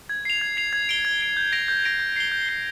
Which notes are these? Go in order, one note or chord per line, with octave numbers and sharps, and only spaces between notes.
G#6
C7 F7
G#6
C7 F7
G#6
D7 G7
G#6
D7 G7
G6
A#6 D7 F7
G6
A#6 D7 F7
G6
C7 G7
G6
C7 G7